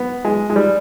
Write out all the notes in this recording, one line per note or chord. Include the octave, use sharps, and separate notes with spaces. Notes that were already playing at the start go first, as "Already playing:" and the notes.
Already playing: B3
G#3
G#3
G3